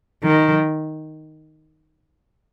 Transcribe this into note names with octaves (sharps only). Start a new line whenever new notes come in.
D#3